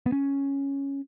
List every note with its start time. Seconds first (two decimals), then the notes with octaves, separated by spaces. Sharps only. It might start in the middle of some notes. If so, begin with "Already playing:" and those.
0.06 B3
0.12 C#4